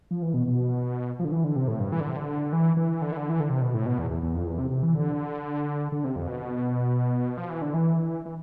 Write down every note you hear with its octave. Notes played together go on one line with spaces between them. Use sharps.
F3
E3
B2
B2
F3
D3
E3
D3
C3
A2
G2
E3
D3
C3
D3
E3
E3
D3
E3
D3
E3
D3
C3
B2
A2
B2
E2
E2
E2
F2
E2
C3
C3
E3
D3
D3
C3
F2
B2
F3
E3
D3
E3
E3